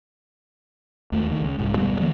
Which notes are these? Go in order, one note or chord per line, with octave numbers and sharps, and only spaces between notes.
D#2 A3
D2 D#3
C#2
C2 G#2
F1 D2 B2 G3
D#3 F3 G#3 A#3